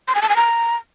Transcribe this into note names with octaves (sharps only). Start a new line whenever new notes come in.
C6
G#5
A5
G#5
A#5